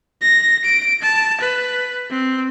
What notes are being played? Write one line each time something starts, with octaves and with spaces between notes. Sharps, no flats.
A#6
D7
A5
B4
C4